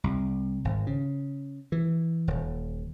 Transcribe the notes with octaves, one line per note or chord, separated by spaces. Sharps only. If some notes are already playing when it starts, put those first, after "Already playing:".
C2
G#1
C#3
E3
D#1